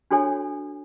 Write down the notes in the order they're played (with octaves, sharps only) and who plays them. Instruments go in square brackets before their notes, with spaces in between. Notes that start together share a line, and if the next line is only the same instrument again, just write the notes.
[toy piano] D4 F#4 A4 C#5 G#5